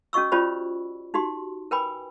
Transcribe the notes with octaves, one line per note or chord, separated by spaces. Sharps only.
C#4 F#4 D#5 C#6 E6
C#4 F4 G4 C5 D5 B5
D#4 F#4 G4 C6
A#4 B4 G5 G#5 B5 D6